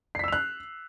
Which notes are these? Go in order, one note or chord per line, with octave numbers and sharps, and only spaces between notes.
E6 F#6 B6 C7 F7